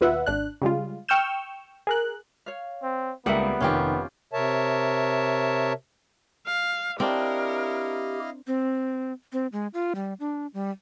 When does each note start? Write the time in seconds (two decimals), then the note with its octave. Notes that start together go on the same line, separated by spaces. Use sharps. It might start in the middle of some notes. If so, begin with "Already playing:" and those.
0.01 D#2 B2 F4 B4 E5 F#5
0.26 G#1 D4 F#6
0.62 C#3 G3 G#3 F4
1.09 G5 C#6 E6 F6 G6 E7
1.87 G#4 A#4 F#6
2.46 C#5 F5
2.83 C4
3.26 C#2 G3 A#3 B3 A4 A#4 E5 F#5
3.61 F1 D#3 C#4 F4 G4 G5
4.33 C3 A#4 C#5 E5 A5
6.47 F5
7.00 C4 D4 E4 G4 A#4 D#5 F5
8.47 C4
9.33 C4
9.52 G#3
9.74 F4
9.95 G3
10.20 D4
10.54 G3